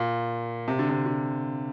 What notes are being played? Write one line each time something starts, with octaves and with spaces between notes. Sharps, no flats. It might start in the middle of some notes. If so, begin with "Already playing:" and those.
Already playing: A#2
C3
D3
C3
D3